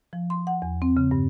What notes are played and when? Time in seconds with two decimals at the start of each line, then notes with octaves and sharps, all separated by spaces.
0.13 F3
0.30 C6
0.47 F#5
0.62 E2
0.82 C4
0.97 C#3
1.11 G2